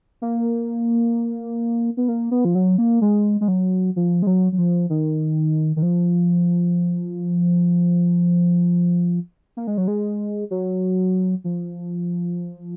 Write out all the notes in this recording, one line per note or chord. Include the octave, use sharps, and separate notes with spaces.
A#3
B3
A#3
B3
F3
F#3
A#3
G#3
G#3
F#3
F3
G#3
F#3
F#3
F3
D#3
D#3
F3
A#3
G#3
F#3
G#3
F#3
F3